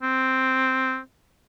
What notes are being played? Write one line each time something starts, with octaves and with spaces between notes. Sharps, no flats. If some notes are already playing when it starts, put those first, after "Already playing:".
C4